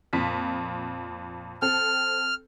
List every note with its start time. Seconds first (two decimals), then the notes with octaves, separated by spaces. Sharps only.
0.13 F2 A#2 B6
1.62 C4 A4 F6